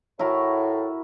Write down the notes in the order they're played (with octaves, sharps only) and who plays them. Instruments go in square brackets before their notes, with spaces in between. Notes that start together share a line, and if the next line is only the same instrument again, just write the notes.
[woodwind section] A2 [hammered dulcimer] E4 F#4 A#4